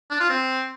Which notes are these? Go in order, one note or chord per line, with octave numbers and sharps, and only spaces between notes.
D4
F4
C4